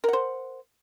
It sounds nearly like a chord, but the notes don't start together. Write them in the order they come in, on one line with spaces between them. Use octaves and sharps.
A#4 F#5 C5